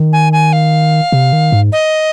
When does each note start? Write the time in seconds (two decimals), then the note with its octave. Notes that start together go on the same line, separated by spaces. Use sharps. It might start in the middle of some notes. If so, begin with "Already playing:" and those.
Already playing: D#3
0.13 G#5
0.33 G#5
0.53 F5
1.12 C3
1.33 D#3
1.52 G#2
1.72 D#5